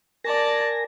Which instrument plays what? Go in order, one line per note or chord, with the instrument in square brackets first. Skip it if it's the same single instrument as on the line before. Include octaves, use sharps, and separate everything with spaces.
[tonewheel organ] A#4 G#5 A#6 [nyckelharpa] D5 A5